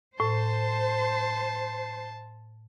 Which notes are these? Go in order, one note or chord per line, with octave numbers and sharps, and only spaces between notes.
A2 C5 A5